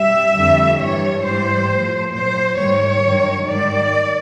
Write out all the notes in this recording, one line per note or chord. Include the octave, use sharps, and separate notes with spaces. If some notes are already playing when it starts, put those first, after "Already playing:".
Already playing: G3 E5
F2 D3 G3
G2 E3 G3 C#5
G#2 E3 G3 C5
A2 F3
A#2 F#3 C5
G#2 D#3 G3 C#5
G2 D#3 F#3
G#2 D#3 G3 D5